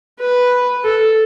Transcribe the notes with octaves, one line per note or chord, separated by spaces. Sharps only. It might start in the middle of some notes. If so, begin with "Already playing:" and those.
B4
A4